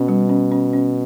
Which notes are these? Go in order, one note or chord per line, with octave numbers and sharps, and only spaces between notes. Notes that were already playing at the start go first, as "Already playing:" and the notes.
Already playing: B2 C#4
G3
C#4
C#4
C#4